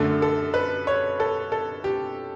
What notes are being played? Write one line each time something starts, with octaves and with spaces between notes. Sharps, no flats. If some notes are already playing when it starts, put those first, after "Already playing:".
Already playing: F#2 D3 A3 A4
A4
B4
C#5
A4
A4
G4